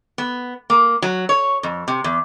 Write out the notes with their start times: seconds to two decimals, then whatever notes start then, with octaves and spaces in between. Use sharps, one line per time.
0.18 B3
0.70 A#3
1.02 F#3
1.29 C#5
1.63 F2
1.88 C3
2.04 E2